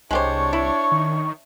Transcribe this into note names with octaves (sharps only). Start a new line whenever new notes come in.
C2 G#3 D4 G4 C5 C#5 C#6
E4 C#6
D#3